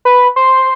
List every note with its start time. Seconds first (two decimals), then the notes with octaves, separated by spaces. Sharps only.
0.05 B4
0.36 C5